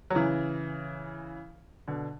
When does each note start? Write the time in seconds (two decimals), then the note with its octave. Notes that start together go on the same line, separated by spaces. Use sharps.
0.10 F#3
0.15 C#3 E3
1.88 B2 D3